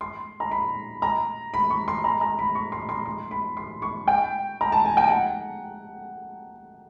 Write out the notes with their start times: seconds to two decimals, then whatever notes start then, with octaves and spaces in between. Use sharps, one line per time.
0.01 C6
0.40 A#5
0.51 B5
1.02 A#5
1.54 B5
1.70 C#6
1.88 C6
2.04 A#5
2.21 A#5
2.39 B5
2.55 C#6
2.72 C6
2.89 C6
3.06 C6
3.31 B5
3.57 C6
3.82 C#6
4.08 G5
4.61 A#5
4.72 A5
4.85 G#5
4.97 G5
5.09 F#5